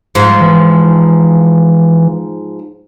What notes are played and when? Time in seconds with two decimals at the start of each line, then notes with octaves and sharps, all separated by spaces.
0.15 G#2 F3
0.41 E3